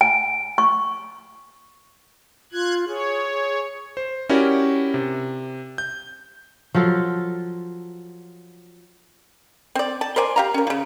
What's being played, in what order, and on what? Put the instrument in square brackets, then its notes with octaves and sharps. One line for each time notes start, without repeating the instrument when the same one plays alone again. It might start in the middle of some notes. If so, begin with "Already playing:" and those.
[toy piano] G#5
C#6
[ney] F4 [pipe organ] F#6 G#6
[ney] G#4 [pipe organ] C#5
[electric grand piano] C5
C#4 E4 F#4 G4 A#4 D5
C3
G6
[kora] F3 F#3 F4 A4
[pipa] C4 D5
A5
A#4 C5 D5 G#5
G4 F5 A#5
C#4 A#4
C#3 F3